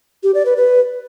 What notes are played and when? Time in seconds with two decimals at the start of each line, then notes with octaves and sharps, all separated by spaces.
0.23 G4
0.34 D5
0.45 B4
0.57 B4